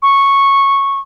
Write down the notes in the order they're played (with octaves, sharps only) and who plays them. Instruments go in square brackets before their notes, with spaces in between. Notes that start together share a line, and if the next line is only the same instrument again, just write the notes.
[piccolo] C#6